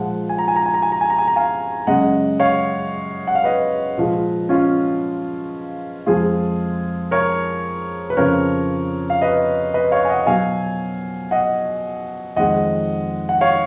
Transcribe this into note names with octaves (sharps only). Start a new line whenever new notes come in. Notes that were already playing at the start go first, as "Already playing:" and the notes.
Already playing: A#2 F3 G#3 F#5
G#5
A#5
G#5
A#5
G#5
A#5
G#5
A#5
G#5
A#5
G#5
A#5
F5 G#5
F#2 C#3 G#3 D#5 F#5
C#5 F5
F#5
F5
B4 D#5
A#2 F3 G#3
C#4 F4
F2 F3 G#3 F4 G#4
A#4 C#5
B4
F2 C#3 F3 A#4 C#5
F5
B4 D#5
B4 D#5
C#5 F5
G#5
D#5 F#5
B2 F#3 F5 G#5
D#5 F#5
F2 D#3 G#3 D#5 F#5
F#5
C#5 F5